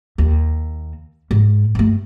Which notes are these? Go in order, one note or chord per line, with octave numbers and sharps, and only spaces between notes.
D#2
G#2
G2 A3